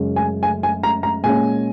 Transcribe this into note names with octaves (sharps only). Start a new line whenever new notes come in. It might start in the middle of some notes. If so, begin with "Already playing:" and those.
Already playing: F#2 C#3 G#3 C#4
G#5
G#5
G#5
A#5
A#5
A#2 G#3 C#4 G#5